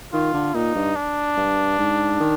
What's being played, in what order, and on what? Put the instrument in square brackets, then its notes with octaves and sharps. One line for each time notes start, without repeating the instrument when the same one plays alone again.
[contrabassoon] D#3 [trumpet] F4
[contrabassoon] D3
[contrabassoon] A#2 [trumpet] D#4
[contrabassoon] G2
[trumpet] D4
[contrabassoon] G2
G#2
D#3